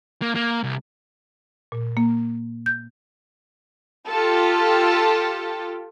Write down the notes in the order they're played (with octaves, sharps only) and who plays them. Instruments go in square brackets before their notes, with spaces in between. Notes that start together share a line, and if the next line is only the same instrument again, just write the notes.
[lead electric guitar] A#3
A#3
C2
[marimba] A#2
A#3
G6
[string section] F4 G4 A4